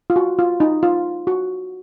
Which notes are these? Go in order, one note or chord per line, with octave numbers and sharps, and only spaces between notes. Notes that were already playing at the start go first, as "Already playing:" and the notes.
F4
F#4
F4
D#4
F4
F#4